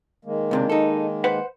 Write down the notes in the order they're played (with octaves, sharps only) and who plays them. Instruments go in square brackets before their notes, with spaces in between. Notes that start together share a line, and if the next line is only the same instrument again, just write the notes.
[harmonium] D#3 G#3 A#3
[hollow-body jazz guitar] C#2 C3 D4
D#4 A4
B4 C5 F#5